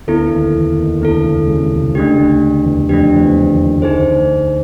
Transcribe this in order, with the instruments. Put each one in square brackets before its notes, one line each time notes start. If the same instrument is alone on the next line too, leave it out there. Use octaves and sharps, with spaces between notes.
[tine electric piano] D2 D3 [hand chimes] B3 E4 A4
[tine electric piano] D#2 D#3
E2 E3
D#2 D#3
[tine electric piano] D2 D3 [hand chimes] B3 E4 A4
[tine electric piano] C#2 C#3
C#2 C#3
C2 C3
[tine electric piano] C#2 C#3 [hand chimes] A3 D4 G4
[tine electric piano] D2 D3
E2 E3
[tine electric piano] F2 F3 [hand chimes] A3 D4 G4
[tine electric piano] F3
E2 E3
D#2 D#3
[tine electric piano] D2 D3 [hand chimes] D#4 G#4 C5